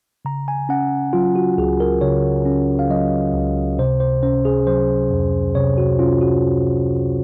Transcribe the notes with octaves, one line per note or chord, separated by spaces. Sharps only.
C#3 A#5
G#5
C#4 F#5
F#3 F4
F#4
C#2 G#4
A#4
C#3 C#5
C#4
F5
F#3 D#5
C#2
C3 C5
C5
C#4 C5
G#4
F#3 C5
F2
C3 C#5
F#4
C#4 F4
F#4